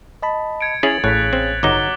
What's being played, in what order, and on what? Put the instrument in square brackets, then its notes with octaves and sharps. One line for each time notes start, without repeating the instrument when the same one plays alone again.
[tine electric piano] D#5 A5 B5
[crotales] G#6 C#7 D7
[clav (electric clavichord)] C#4 E4 G#4 [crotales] A6 F7 F#7
[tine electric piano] A1 C#5 [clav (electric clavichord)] A2 [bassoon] C#3 [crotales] F#6 B6
[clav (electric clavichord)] C4
[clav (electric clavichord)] G1 D#4 [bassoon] F#3 [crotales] D6 G7